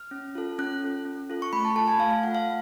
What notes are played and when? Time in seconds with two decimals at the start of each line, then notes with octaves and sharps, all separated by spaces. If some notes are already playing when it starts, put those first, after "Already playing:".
Already playing: F6
0.11 C#4
0.35 F4 A4
0.59 C#4 F#6
0.82 F4 A4
1.05 C#4
1.30 F4 A4
1.42 C#6
1.53 A3 B5
1.65 A5
1.76 F4 A4 A5
1.88 G#5
1.99 A3 F5
2.11 F5
2.23 F4 F#5
2.28 A4
2.35 F5
2.46 A3